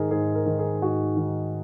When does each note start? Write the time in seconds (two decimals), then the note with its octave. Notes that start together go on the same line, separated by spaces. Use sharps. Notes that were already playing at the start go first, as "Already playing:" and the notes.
Already playing: G#2 D#3 G#4 A#4
0.11 G#2 G#4
0.35 A#4
0.46 D#3
0.59 G#4
0.82 G#2 F#4
1.17 D#3